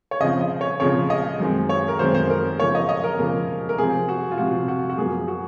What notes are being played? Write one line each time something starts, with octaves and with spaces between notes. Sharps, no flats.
C#5
C#3 F3 C4 D#5
D#5
C#5
C#3 F3 C4 C#5
D#5
F#2 D#3 G#3 C4
C#5
A#4
F#2 D#3 G#3 C4 C5
C5
A#4
C#3 F3 A#3 C#5
D#5
D#5
A#4
C#3 F3 A#3
A#4
C3 F3 C4 G#4
F#4
F4
C3 F3 C4 F#4
F#4
F#4
F#2 F3 A#3 G#4
F#4